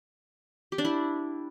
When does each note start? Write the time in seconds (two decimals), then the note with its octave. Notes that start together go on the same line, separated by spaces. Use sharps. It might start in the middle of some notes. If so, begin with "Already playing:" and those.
0.72 G4
0.78 D4
0.85 E4